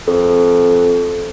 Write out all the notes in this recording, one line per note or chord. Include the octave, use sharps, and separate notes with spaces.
F2